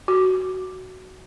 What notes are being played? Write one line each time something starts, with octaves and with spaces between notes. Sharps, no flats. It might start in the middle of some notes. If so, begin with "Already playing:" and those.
F#4